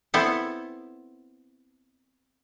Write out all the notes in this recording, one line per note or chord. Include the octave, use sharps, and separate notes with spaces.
B3 C4 E4 A4